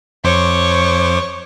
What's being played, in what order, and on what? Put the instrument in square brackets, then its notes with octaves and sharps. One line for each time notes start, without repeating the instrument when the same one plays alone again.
[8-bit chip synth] F2 C5 D6 [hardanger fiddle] C#5 C#6